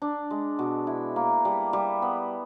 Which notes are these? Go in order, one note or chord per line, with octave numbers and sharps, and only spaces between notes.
D4
G#3
B2
E4
A#3
G3
G3
B3